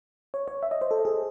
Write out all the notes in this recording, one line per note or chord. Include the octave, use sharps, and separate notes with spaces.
C#5
C#5
E5
D#5
C5
A4
G#4